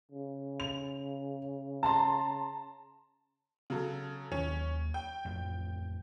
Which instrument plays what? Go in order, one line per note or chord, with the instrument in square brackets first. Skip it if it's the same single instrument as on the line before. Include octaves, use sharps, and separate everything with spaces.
[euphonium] C#3
[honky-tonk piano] F7
A5 A#5 C6
C#3 F#3 A4
[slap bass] D#2 D#3 F#3 [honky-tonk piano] C#4
[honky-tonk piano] G5
[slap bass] A1 F2